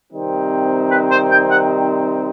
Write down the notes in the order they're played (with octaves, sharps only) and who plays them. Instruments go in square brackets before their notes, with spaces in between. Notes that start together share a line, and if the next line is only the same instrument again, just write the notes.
[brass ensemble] C3 D#3 G3 C4 D#4
[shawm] B4
C5
G5
F#5